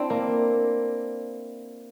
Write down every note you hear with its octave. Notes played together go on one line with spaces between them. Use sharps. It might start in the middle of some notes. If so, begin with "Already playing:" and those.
Already playing: C4 D4 E4
A#3